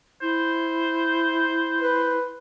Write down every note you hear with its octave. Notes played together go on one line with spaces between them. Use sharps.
E4 C5
B4